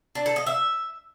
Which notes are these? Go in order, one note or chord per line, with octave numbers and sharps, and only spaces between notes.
D4
A4
D#5
E5